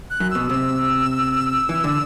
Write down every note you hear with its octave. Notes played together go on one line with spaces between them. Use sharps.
F#6
F#2
B2 E6
C3 E6
E3
D3